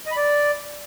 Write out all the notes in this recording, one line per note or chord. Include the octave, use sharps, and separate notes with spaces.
D#5
B5
D5